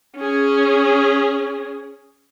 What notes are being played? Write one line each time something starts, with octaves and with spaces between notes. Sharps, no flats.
C#4 G#4